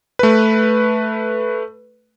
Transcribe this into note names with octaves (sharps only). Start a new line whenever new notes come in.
A3 B4